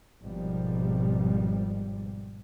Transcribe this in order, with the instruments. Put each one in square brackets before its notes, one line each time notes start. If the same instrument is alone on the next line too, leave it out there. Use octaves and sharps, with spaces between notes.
[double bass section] G#1 B2 F3 G3